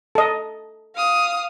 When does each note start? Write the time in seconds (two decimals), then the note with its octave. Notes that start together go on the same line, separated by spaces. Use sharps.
0.15 A4 D#5
0.96 F5 D#6